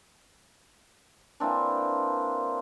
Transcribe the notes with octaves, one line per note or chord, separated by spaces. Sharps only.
E3 A#3 C4 D4